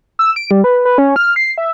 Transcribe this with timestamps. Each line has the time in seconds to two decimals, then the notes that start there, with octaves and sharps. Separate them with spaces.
0.19 E6
0.36 D7
0.51 G3
0.64 B4
0.85 B4
0.98 C#4
1.16 F6
1.36 C7
1.58 E5